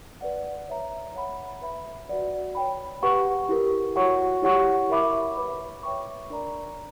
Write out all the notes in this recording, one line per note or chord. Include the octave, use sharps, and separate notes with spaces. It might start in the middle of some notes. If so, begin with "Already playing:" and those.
B4 D5 F#5
C#5 E5 A#5
C#5 F#5 B5
B4 E5 B5
F#4 B4 D5 F#5
C#5 G5 B5
G4 B4 F#5 C#6
E4 G4 A#4
F#4 C#5 F#5 C#6
E4 G4 C#5 F#5 C#6
A#4 E5 B5 D6
B4 E5 B5 D6
C#5 G5 C#6
D4 A#4 D5 A#5